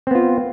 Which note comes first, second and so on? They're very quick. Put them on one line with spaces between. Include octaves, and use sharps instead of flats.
C4 B3 F4